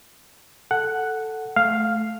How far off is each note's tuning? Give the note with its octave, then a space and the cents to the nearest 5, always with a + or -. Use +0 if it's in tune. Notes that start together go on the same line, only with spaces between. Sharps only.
A4 +0 F#5 +0
A3 -20 F5 +0